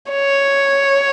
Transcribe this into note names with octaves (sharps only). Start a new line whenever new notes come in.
C#5